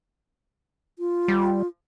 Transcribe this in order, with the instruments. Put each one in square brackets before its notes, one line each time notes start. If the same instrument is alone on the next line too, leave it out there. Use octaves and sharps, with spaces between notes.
[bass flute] F4
[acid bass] G3